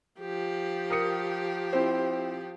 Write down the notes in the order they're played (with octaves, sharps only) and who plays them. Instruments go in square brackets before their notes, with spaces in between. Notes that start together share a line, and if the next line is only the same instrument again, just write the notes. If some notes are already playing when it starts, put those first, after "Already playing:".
[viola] F3 G4
[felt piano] A#4 D#6 C#7
C4 E4 C5